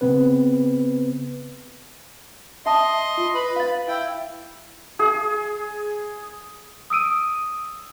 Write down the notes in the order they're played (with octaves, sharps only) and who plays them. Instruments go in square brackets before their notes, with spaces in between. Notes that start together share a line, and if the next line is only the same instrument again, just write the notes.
[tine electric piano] C#3 B3 C4 B4
[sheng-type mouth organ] D#5 C6 [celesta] E5 A5 D#6
[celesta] F4
[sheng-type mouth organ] B4 B5
[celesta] F5 A6
[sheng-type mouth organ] E4 G5
[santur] G#4
[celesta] D#6 E6 D7 D#7